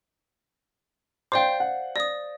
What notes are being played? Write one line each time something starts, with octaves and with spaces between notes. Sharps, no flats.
C5 D5 F5 G5 C6
F#5
D5 D#6 A#6